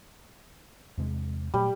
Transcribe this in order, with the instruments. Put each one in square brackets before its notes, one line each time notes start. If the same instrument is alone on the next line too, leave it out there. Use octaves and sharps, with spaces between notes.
[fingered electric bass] E2 C3 G#3
[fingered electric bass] A#2 F#3 A3 [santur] G3